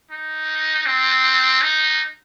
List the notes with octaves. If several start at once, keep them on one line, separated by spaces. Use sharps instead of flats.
D#4
C4
D#4